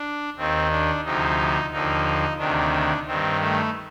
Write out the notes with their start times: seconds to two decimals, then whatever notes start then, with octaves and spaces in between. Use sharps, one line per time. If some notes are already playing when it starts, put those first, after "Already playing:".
Already playing: D4
0.36 D#2 D#3 C4
0.70 D4
1.04 D2 C3 F3 D#4
1.71 D#2 D3 F3 D#4
2.38 D2 C3 D#3 D4
3.07 G2 D#3 C4
3.40 A3